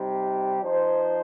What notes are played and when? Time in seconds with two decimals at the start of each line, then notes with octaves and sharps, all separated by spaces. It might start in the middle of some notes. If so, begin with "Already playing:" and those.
Already playing: C3 G3 D#4 G4
0.62 F3 D#4 C5